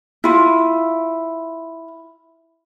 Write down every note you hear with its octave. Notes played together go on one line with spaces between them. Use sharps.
E4 F4